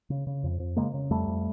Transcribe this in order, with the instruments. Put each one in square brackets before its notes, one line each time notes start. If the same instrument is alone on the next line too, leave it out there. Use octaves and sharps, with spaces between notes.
[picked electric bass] C#3
C#3
F2
F2
C#3 G#3 A#3
C#3
F2 G3 A3
F2